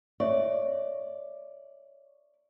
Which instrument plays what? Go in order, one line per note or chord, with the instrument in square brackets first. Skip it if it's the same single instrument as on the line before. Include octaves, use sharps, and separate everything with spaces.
[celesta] C#5 E5 C#6 [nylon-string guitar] D5